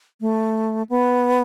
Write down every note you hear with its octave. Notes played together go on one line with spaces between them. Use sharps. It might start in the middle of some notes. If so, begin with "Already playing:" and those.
A3
B3